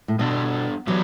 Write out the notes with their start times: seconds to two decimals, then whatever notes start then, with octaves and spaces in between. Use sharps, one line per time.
0.08 A2
0.19 B2 G3 D4 A4
0.87 E3 F#3 B3 D4 G4